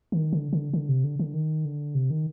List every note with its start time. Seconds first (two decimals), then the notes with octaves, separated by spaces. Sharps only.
0.12 D#3
0.33 D3
0.53 D3
0.73 D3
0.89 C3
1.04 D3
1.19 D3
1.34 D#3
1.65 D3
1.95 C3
2.10 D#3